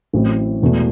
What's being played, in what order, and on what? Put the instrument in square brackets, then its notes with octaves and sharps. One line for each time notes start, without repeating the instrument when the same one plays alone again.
[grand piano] A1 A2 F#3 C4 E4
E1 E2 B2 A3